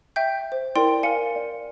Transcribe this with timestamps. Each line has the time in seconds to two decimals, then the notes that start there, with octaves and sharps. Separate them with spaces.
0.16 E5 G5 G6
0.52 C5
0.76 E4 A#4 D5 G5 C6
1.03 A#4 F5 G#5 C#7
1.36 D5